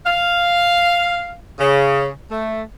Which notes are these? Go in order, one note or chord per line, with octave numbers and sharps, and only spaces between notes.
F5
C#3
A3